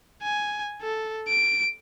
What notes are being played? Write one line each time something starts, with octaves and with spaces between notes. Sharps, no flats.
G#5
A4
D7